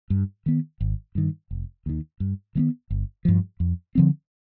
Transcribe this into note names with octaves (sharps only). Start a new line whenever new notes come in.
G2
D#3 B3
G#1
G2 D#3
F1
D#2 D#3
G2
D#3 G#3 B3
G1
G2 F3
F2
D3 F3 C4